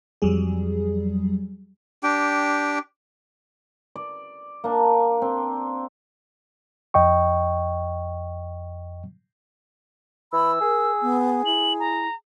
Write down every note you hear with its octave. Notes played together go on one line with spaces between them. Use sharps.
F2 F#3 G3 G#4
D4 G4 G5
D5
A#3 D4
C4
F2 D#5 G5 C#6
E3 B5 E6
G#4 A#4
B3
E4 F#7
A#5